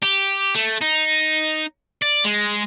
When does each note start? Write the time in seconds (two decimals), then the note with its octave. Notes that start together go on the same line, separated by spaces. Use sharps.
0.03 G4
0.55 A3
0.82 D#4
2.02 D5
2.25 G#3